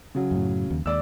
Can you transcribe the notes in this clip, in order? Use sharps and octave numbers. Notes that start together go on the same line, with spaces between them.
C#3 F#3
F#2 A2
D#2
D#2 G#3 D5 E6